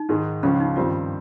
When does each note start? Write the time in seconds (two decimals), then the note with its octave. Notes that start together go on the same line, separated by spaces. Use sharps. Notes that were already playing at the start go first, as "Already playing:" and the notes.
Already playing: D#4
0.09 G#2 D#3 G#3
0.43 C#2 C#3 F3 C#4
0.60 D#4
0.76 G2 D#3 G3 C4 F4